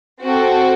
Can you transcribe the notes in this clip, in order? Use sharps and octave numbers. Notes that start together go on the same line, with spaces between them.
C4 F#4 A4